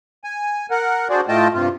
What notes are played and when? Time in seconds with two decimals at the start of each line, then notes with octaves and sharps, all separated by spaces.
0.24 G#5
0.71 A#4 F#5
1.10 D4 F#4 G#4 C5 D5
1.28 A2 A3 F4 D#5 G5 A5
1.54 G2 C3 F4